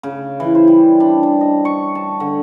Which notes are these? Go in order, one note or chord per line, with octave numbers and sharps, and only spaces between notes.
C#3
E3
C5
G3
D4
A5
D#5
C#6
A5
D3